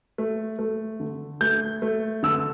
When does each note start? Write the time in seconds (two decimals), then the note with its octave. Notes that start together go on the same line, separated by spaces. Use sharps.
0.18 A3
0.59 A3
1.00 D3
1.41 A3 G6
1.82 A3
2.23 D3 E6